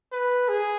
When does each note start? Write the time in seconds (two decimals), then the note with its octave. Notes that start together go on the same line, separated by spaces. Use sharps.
0.12 B4
0.49 G#4